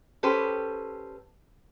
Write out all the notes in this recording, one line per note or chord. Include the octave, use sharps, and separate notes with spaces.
C#4 G4 A4 B4 C5